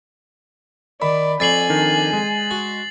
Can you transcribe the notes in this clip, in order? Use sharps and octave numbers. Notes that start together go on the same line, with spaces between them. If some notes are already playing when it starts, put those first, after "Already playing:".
D#3 D5 B5
F2 D5 G#5 C#6 A6 C7 F#7
D#3 D4
G#3
F#4